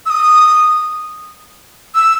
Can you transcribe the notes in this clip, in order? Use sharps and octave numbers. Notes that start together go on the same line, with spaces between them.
E6
D#6
E6